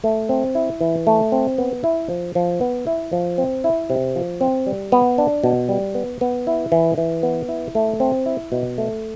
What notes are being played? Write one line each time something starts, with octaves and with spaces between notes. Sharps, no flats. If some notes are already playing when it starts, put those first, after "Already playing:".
A3
C4
E4
E3
A3
C4
B3
E4
F3
F3
B3
E4
F3
C4
E4
C3
F3
C4
G3
B3
D4
B2
G3
B3
B3
E4
E3
E3
B3
E4
A3
C4
E4
B2
A3